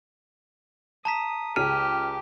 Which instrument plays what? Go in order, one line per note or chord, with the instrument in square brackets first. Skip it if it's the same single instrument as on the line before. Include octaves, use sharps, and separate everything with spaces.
[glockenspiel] A5 A#5 B6 [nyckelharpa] D#6
[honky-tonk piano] C#2 G#4 D#7 [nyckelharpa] G4 [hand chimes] F6